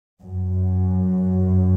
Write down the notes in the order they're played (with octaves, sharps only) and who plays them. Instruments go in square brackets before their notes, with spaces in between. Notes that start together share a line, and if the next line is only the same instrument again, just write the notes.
[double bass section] F#2